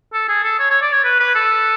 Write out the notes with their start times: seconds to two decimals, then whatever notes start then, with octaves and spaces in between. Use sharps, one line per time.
0.13 A4
0.28 G#4
0.44 A4
0.59 C#5
0.70 C#5
0.82 D5
0.93 C#5
1.04 B4
1.20 B4
1.35 A4